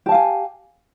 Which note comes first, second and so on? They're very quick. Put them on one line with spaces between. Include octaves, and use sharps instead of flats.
G4 A5 F5 G#5